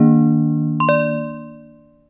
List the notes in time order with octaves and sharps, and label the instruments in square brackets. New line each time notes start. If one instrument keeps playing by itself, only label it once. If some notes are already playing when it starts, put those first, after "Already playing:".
Already playing: [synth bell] D#3 A#3 D4
C6
D5